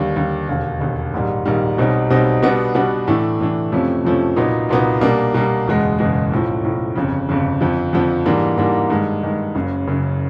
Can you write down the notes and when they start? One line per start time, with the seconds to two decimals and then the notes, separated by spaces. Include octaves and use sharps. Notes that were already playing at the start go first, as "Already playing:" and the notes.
Already playing: D#2 D3 G3
0.16 D#2 D3 G3
0.49 E1 D#2 D3
0.81 E1 D#2 D3
1.14 A#1 G#2 D#3 G3
1.45 A#1 G#2 D#3 G3
1.78 B1 B2 G3 C4 D#4
2.10 B1 B2 G3 C4 D#4
2.42 B2 G3 B3 D4 F#4
2.74 B2 G3 B3 D4 F#4
3.07 A2 E3 A3 D4
3.40 A2 E3 A3 D4
3.72 F2 C3 F3 A3 C#4
4.04 F2 C3 F3 A3 C#4
4.36 C2 A#2 F#3 B3 D#4
4.69 C2 A#2 F#3 B3 D#4
5.01 B2 G3 A#3 D4
5.34 B2 G3 A#3 D4
5.67 F#1 E2 B2 G#3
5.99 F#1 E2 B2 G#3
6.32 B1 A2 F3
6.63 B1 A2 F3
6.95 G1 F2 C#3
7.29 G1 F2 C#3
7.61 F2 D3 F3
7.93 F2 D3 F3
8.25 G#2 E3 G3 A#3 D4
8.57 G#2 E3 G3 A#3 D4
8.90 G2 D#3 G#3
9.23 G2 D#3 G#3
9.55 F#1 F#2 C#3
9.87 F#1 F#2 C#3